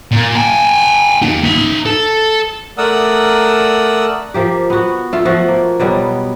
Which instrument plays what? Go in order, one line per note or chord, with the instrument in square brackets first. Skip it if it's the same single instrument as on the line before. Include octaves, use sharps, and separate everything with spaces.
[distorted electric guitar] A#2
G5 G#5
A#3 D#4
D#4 E5
A4 A5
[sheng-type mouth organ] A3 A#4 D5 F#5 D#6 E6
[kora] F3 A#3 G4
B3 F#4
A3 F4
F3 F#4
A#3
B2 F#3 G3 B3